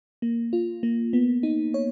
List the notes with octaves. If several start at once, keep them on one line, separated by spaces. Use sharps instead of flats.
A#3
F4
A#3
B3
D#4
C#5